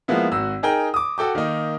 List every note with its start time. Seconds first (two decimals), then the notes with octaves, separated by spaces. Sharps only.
0.08 F3 G#3 A#3 B3 E4
0.31 G#1 F#4 E6
0.63 D#4 G#4 A#4 G5
0.94 D6 D#6
1.18 F#4 A4 G5 D6
1.35 D#3 A#3 D#4